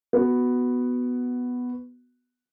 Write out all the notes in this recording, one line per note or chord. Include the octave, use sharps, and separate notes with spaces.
B3 F#4